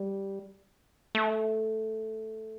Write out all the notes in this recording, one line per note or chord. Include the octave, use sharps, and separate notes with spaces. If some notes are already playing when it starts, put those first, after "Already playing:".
Already playing: G3
A3